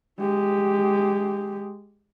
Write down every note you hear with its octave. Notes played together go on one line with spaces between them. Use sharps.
G#3 G4